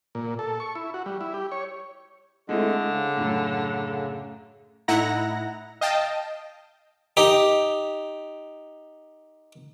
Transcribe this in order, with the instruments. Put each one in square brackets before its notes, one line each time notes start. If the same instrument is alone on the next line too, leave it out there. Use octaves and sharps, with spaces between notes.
[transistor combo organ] A#2
A4
C#6
E4
F#4
G3
E4
G4
C#5
[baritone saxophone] D3 [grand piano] G#3 C4 E4 [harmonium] A3 D#5
[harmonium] C#3
[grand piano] F#2 A2
[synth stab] A2 D#4 E4 F#5 A#5 A#6
D#5 F5 G5 A5
[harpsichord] D#4 G4